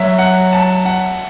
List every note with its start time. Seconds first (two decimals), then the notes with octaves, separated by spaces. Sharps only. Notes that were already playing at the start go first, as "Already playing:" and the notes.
Already playing: F#3 E5
0.19 F#5
0.53 A5
0.85 F#5